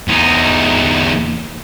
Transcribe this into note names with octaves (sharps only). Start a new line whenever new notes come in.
E2 D#4